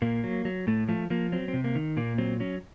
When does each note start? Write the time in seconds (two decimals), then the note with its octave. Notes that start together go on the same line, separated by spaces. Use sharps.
0.02 A#2 A#3
0.24 F#3
0.45 F#3
0.67 A2 A3
0.88 F3 A3
1.10 F3 A#3
1.32 F#3 C4
1.48 C4
1.53 C3
1.64 A#3
1.75 D#3
1.97 A#2 A#3
2.18 F#3 C4
2.40 F#3 C#4